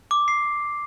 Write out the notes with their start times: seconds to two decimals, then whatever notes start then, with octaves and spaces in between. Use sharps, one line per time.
0.11 D6
0.28 C7